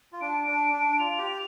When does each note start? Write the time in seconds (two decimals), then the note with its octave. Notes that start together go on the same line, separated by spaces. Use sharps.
0.13 F4
0.21 D4 D7
0.47 D4
0.73 D4
0.99 F4 F7
1.18 G4